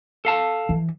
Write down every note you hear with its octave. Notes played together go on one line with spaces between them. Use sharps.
A4 F5 A5
E3